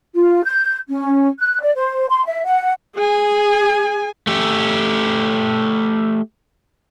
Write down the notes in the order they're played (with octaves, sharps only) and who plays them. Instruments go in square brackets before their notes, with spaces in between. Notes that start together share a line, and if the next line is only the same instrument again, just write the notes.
[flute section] F4
G6
C#4
F#6
D5
C5
C6
E5
F#5
[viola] G#4 G#5
[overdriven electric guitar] A3 G4